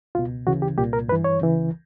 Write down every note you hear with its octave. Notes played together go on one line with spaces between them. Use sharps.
C#2 B2 F4
D2 C#3 E3 F#4
G4
C2 A#2 G4
A#4
G2 E3 B4
C#5
C#2 C#3 E3